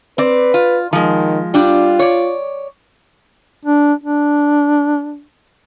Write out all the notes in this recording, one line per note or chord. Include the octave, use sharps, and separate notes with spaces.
C4 B4 D5
F4
D#3 F3 G#3
G3 D4 F4
C#5 D5
D4
D4